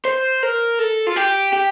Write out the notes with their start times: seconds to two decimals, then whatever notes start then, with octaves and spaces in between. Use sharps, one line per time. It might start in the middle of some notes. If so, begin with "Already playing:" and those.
0.05 C5
0.43 A#4
0.79 A4
1.07 F4
1.16 G4
1.53 G4